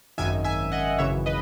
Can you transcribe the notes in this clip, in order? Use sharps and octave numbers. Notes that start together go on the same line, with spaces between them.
G#1 F#2 D#3 E5 G#5
E5 G#5
D#5 F#5
G#1 F#2 C#3 E3 C#5 E5
B4 D#5